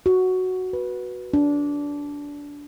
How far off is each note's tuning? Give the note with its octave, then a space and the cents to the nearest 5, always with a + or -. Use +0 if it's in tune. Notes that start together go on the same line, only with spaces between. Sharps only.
F#4 +0
B4 -10
D4 -20